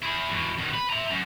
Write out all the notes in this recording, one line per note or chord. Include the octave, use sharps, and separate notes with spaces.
E4 G#4
E2 B2
B2 D#3
B4
E5 A#5
F#2